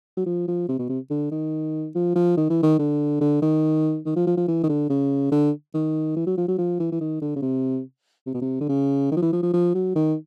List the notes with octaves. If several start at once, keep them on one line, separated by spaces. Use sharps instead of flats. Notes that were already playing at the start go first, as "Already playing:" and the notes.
F#3
F3
F3
C3
B2
C3
D3
D#3
F3
F3
D#3
E3
D#3
D3
D3
D#3
D#3
F3
F3
F3
E3
D#3
D3
C#3
D3
D#3
E3
F#3
F3
F#3
F3
E3
E3
D#3
D3
C#3
C3
C3
B2
C3
D3
C#3
D#3
F3
E3
F3
F3
F3
F#3
D#3